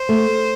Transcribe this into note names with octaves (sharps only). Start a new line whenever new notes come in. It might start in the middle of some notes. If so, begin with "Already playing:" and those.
Already playing: C5
A3